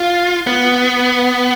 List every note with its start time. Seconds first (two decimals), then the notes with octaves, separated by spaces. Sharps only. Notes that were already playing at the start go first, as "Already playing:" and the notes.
Already playing: F4
0.47 B3